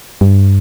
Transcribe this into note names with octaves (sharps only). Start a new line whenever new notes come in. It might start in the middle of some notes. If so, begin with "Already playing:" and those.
G2